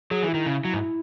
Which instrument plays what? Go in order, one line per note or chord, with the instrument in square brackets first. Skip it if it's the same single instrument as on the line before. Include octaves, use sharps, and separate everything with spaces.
[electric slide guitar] F#3 [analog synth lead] G#4
[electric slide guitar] E3
[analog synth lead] E4
[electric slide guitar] D#3
C#3
F#3
G#2